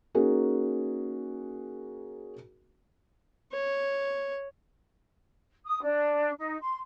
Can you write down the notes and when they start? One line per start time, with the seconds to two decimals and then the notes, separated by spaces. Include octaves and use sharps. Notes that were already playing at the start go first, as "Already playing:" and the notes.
0.15 A#3 C#4 D#4 F#4 G#4 A#4
3.52 C#5
5.65 D#6
5.82 D4
6.38 D#4
6.61 C6